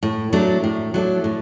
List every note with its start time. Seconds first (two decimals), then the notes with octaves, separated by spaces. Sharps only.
0.03 A2
0.33 F#3 A3 D4
0.64 A2
0.94 F#3 A3 D4
1.24 A2